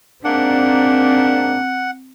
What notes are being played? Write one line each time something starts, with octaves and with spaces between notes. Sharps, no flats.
G#2 A#3 C4 D4 F#5